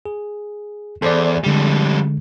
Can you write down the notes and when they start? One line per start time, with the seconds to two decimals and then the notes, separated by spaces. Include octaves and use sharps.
0.06 G#4
1.02 E2 A4 C5 D5
1.44 F2 D3 G3 G#3